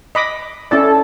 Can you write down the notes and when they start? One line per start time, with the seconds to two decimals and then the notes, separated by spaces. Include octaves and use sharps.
0.15 D#5 B5 D6
0.71 C#4 E4 A4 D5